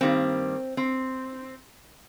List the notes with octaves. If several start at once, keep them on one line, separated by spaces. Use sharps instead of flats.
G2 D#3 G3 A#3 C4
C4